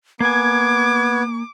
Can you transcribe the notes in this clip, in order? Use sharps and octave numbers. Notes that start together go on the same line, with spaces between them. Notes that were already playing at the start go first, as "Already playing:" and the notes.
A#3 B3 G#5 D6 G#6